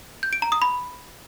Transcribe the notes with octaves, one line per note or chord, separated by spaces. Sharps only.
G6
D7
A#5
D#6
B5